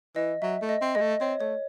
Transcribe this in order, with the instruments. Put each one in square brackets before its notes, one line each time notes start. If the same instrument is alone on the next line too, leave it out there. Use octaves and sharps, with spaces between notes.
[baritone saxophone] E3 [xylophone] D#5
[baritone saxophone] F#3 [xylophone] E5
[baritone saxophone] A3
[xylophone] D#5
[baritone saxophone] C4
[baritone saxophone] G#3 [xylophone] D#5
[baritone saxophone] A3
[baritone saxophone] C4 [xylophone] C#5
[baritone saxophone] A3 [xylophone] C#5